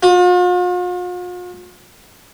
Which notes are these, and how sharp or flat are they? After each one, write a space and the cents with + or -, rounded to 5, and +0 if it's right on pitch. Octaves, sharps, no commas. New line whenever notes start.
F4 +45